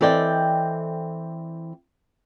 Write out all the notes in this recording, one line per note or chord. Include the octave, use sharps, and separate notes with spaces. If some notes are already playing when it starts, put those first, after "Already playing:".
E3 C4 A4 D5 D#5 G5